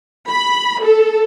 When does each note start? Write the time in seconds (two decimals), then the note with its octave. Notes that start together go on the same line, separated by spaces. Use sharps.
0.30 B5
0.83 A4